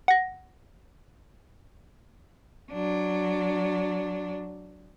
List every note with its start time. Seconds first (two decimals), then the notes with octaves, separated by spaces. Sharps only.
0.08 F#5 A#6
2.72 F#3 D4